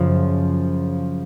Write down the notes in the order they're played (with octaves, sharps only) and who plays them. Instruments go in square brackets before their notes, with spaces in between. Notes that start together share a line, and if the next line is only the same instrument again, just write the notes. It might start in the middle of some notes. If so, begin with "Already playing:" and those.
Already playing: [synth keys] F#2 C#3 F3